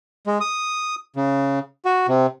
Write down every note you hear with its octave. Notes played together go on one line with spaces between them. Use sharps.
G#3
D#6
C#3
F#4
C3